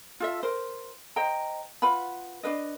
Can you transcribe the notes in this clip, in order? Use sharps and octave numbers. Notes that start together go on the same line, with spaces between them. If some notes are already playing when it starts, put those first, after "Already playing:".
F4 A4 E5
A#4 C5
C5 D#5 G5 A#5
F4 B4 F#5 B5
D4 F4 B4 D#5